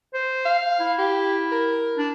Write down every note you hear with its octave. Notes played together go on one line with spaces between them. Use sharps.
C5
F5
E4
G4
A#4
D4